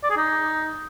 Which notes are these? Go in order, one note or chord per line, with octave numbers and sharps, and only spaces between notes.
D5
G#4
D#4